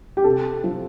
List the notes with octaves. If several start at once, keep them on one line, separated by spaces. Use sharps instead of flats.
G4
C3 A4
F3